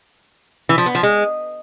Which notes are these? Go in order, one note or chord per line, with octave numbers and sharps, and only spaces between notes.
E3
F3
B3
F3
G#3